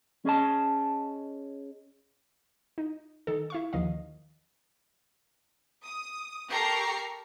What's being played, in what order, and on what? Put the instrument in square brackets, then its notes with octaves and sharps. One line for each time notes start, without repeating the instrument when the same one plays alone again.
[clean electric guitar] C#4 G#4 D#5 A5
[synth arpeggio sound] D#4
D#3 A4
E4 F5 C#6
D#2 D#3 F3 D#5 F5
[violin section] D#6
G4 A4 A#4 A#5 C#6 C7